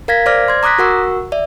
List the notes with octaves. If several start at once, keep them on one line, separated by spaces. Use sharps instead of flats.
A#4 F5 G#6 A#6 B6
C5 D5 D6 F6 A#6
C6 G#6
A#5 D6 D#6 F#6 A#6 B6
F#4 A#4 F#5 C#6 E6
D5 E5